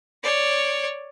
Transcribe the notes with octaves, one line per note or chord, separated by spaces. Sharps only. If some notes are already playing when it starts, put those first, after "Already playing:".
C#5 D5